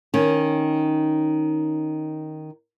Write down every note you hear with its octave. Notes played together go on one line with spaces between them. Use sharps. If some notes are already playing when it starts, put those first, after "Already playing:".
D#3 C#4